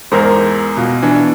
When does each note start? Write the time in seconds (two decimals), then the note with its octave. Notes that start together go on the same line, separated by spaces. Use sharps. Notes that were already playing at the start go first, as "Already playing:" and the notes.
0.12 E2 G#2 A#4 C5
0.77 B2 F4
1.02 E3 D4 G#5